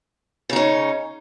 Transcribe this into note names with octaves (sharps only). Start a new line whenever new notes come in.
C#3 C#4 D#4